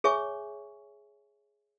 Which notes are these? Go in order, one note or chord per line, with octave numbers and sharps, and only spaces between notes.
G#4 C#5 E5 G#5 C#6